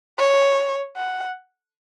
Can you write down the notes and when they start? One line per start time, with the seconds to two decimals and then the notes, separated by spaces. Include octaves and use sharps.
0.18 C#5
0.97 F#5